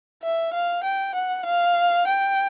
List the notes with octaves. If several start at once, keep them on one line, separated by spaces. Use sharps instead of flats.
E5
F5
G5
F#5
F5
G5